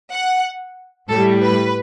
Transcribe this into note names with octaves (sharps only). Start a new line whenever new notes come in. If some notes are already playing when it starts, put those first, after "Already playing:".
F#5
A2 G3 A4
B4